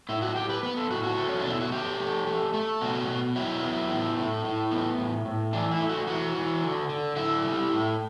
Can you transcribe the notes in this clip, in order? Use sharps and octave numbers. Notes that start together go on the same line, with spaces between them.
A2 E4
F#4
A2 G4
B4
B3 B4
A4
A2 F#4
F#4
A3
C#4
D4
B2
E4
F#4
A3 G4
A3
A3
A3
B2 F#4
B2
F#3 E4
B3
A2
A2
A2
B3
A2
A2
E3 D4
E4
A3
F#4
E3 F#4
E3
D3
D3
D3 E4
G3
A2